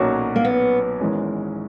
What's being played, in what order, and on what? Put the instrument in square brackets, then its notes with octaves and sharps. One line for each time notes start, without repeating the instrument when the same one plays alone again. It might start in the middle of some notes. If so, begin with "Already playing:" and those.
Already playing: [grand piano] B1 A#2 F#3 C#4 F#4
[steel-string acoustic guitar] A#3
B3
[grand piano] G#1 G#2 E3 G#3 C#4